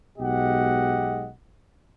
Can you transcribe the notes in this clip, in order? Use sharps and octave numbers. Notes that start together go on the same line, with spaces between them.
B1 B2 G#3 G4 D#5 F#5